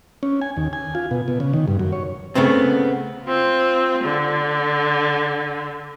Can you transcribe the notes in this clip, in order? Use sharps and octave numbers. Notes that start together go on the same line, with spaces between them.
C#4
G#5
D#2
G#5
F4
B2
B2
C#3
D#3
G2
F#2
C#5
C#3 A3 B3 C4
C4 F4
D3